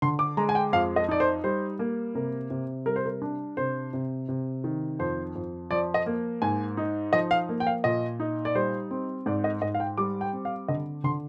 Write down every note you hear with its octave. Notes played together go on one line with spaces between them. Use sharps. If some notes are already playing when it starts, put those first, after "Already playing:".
D3 C6
D6
G#3 A#5
G#5
G5
F2 F5
D#5
D#4 D5
C5
G3 C5
A#3
C3 A#4
C3
G3 A#4
C5
A#4
D4
C3 C5
C3
C3
D#3
F2 C5
F2
F3 D5
D#5
A#3
G#2 G#5
D#4
F3 D#5
F5
A#3
G5
F5
A#2 D#5
D#4
D5
G3 C5
C4
G#2 D5
D#5
G#2 D#5
F5
G5
G3 D6
G5
C4
F5
D3 D#5
D3 C6